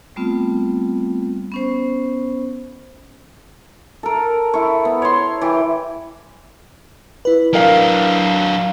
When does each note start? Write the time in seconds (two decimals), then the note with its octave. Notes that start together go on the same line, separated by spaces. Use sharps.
0.16 G3 A3 B3 C4 F4
1.52 B3 C#4 C5
4.03 A4 A#4
4.54 E4 C#6
4.85 B3
5.02 C#5 C6
5.41 E3 G4
7.25 E4 B4
7.53 F#3 D4 A#4 F5